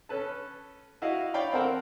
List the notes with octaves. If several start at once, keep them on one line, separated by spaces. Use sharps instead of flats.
C#4 A4 B4 A5
E4 F#4 D#5 F5
C#5 D5 F5 G5 B5
C4 A4 A#4 F#5 G5 A5